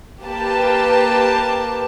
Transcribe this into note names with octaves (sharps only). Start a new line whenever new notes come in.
A#3 G4 B4 A5